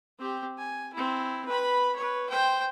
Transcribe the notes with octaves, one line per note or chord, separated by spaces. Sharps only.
C4 G4
G#5
C4 E4
B4 B5
B4 C#5
C5 G5